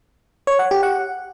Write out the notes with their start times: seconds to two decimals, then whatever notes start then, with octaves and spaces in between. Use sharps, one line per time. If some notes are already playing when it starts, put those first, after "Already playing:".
0.47 C#5
0.59 F#5
0.71 G4
0.83 F#5